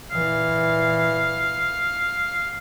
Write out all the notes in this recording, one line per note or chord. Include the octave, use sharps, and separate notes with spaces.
A#2 E3 F5